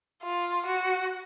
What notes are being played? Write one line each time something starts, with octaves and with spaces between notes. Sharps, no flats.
F4
F#4